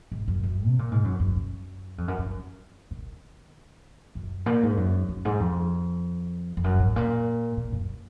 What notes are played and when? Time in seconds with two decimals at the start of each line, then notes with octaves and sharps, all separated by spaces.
0.12 G#2
0.28 F#2
0.43 F#2
0.66 C3
0.79 A#2
0.92 G#2
1.04 F#2
1.20 F#2
1.36 F#2
1.98 F2
2.08 F#2
2.18 F#2
2.91 D#3
4.15 F#2
4.46 A#2
4.63 G#2
4.77 F#2
5.09 F#2
5.25 G#2
5.40 F2
6.57 F2
6.64 F#2
6.79 G#2
6.96 A#2
7.57 A#2
7.73 F#2